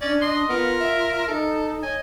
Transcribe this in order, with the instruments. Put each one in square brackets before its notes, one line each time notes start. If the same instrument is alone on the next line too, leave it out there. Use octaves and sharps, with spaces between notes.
[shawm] C#4 [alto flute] D4 [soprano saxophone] D5
[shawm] D#5 [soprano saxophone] C6
[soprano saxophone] B3 [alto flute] F4 [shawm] A#4
[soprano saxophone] E5
[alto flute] D#4 [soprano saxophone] A4
[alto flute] C#5 [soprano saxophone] D#5 [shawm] G#5